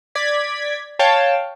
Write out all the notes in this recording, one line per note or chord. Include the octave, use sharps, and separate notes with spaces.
D5 G#6 B6
C#5 F5 G5 A5